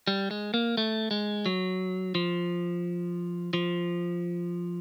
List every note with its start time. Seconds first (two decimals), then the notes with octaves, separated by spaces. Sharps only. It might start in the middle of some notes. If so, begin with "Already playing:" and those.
0.07 G3
0.31 G#3
0.54 A#3
0.77 A3
1.11 G#3
1.46 F#3
2.15 F3
3.53 F3